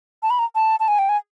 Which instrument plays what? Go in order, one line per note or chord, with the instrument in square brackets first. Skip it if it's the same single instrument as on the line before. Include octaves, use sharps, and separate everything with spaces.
[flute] A5
B5
A#5
A5
A5
G#5
G5
G#5